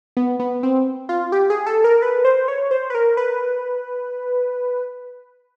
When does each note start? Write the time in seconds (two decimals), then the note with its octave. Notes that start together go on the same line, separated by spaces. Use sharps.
0.17 B3
0.40 B3
0.63 C4
1.09 F4
1.32 G4
1.50 G#4
1.67 A4
1.84 A#4
2.02 B4
2.25 C5
2.48 C#5
2.71 C5
2.90 B4
2.95 A#4
3.17 B4